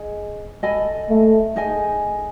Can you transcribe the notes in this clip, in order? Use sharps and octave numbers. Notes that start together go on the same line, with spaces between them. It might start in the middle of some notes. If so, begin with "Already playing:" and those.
Already playing: G#4 D#5 G#5
A4 D#5 G#5 B5
A3
D#4 G#4 D#5 G#5